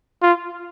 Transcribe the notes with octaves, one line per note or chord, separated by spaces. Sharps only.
F4